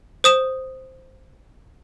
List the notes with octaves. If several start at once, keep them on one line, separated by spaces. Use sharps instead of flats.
C5 D#6 E7